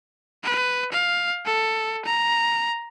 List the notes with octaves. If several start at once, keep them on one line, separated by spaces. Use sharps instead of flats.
B4
F5
A4
A#5